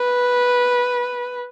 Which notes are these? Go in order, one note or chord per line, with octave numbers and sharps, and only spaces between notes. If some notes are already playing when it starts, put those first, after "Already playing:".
Already playing: B4